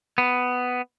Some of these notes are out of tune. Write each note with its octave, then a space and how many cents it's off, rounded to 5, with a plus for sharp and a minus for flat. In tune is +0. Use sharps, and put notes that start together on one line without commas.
B3 +10